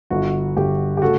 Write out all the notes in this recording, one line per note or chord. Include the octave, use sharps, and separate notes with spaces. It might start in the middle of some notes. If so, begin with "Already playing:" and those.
G1 G2 D3 F#4
G1 G2 D3 G4
G4
C#3 A3 F#4 A4